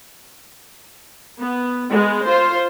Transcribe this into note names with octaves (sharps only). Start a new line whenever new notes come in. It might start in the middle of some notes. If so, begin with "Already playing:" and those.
B3
G#3 B3
F4 C5